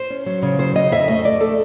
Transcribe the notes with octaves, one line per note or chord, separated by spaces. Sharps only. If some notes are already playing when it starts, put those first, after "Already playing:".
Already playing: C5
C#4
F#3
C#3
F#3 C5
C#3 D#5
F2 E5
A3 D#5
A3 D5
A3 A4